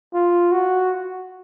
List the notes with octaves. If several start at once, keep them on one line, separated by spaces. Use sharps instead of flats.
F4
F#4